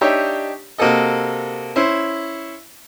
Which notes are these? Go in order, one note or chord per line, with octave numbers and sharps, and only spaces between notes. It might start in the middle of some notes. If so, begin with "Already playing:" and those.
D4 D#4 G4 C#5 E5 G5
C3 A#3 F#4 A4 D#5
C#4 E4 C5